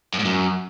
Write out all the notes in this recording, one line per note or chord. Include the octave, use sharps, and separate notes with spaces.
F#2
G#2
F#2